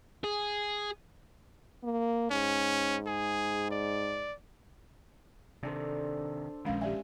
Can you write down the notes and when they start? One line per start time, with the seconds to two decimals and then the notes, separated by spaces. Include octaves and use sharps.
0.24 G#4
1.83 A#3
2.31 G#2 C#4
3.07 G#4
3.71 D5
5.63 C3 D#3 D4 A4 C5
6.65 A#1 D#3 G#3 C#4 F5
6.81 G4 D5 E5 G#5